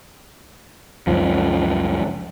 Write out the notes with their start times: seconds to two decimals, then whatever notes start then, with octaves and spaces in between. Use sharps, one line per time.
1.07 C#2 F#2 F3